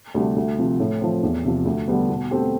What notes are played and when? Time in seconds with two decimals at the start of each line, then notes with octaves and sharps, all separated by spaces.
0.14 D2 C3 G3 D4
0.36 D2
0.58 C3 F3 C4
0.80 A2
1.01 F3 C4
1.23 E2
1.45 C3 F3
1.65 D2
1.88 D3 G3 B3
2.09 B2
2.31 A3 C4 G4